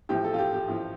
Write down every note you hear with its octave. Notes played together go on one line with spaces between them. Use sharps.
A1 A2 F3 G4
A4
F4
G4
G4
A1 A2 F3